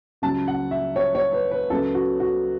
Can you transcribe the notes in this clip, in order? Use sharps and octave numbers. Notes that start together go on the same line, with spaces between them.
C#2 C#3 F#3 A5
F#5
E5
C#5
C#5
B4
B4
C#2 C#3 F#3 B3 A4
F#4
F#4